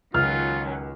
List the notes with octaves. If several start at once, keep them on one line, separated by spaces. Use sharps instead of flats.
C#2 D#3 F#3 C#4 F4 F6